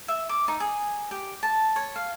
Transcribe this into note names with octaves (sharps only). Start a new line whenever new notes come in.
E5
D6
D#4
G#4
G4
A5
C#5
F5